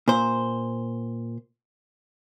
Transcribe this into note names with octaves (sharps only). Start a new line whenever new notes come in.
A#2 C5